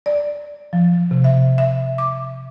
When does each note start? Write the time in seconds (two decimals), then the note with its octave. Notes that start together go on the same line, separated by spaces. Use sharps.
0.06 D5
0.73 F3
1.11 C3
1.24 E5
1.58 E5
1.98 D6